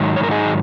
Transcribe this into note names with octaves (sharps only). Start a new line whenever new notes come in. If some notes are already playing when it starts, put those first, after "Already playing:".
Already playing: G#2 D#3 F#3
C#5
A#4
D#4 G#4